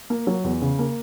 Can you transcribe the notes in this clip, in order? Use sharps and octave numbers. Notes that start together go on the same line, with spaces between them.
A#3
F#3
E2
C#3
A#3